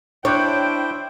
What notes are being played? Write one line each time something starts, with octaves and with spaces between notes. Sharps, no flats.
D4 E4 C5 C#5 G5 D6 F#6